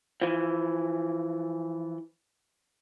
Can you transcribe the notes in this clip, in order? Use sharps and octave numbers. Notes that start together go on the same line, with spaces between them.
E3 F3